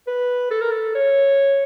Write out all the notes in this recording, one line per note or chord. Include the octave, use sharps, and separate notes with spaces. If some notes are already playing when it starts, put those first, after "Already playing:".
B4
A4
A#4
A4
C#5